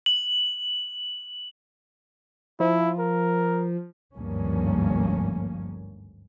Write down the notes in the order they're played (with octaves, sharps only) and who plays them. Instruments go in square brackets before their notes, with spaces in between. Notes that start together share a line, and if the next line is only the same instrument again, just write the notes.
[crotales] F#7
[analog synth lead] F3 [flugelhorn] E4
[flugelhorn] A#4
[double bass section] G#1 D2 G2 F3 A#3 C#4